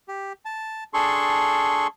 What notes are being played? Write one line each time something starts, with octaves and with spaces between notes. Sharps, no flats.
G4
A5
D4 G#4 A4 C6 C#6